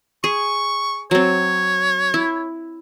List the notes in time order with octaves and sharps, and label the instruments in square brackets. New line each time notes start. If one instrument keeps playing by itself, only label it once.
[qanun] G#4 [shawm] C#6
[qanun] F#3 C4 [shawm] C#5
[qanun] E4